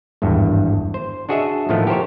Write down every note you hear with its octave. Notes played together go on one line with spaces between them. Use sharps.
G#1 E2 G2
C5
D4 F#4 G#4 D#5 E5
A2 D#3 F3 A3 B3
G4 A#4 C5 C#5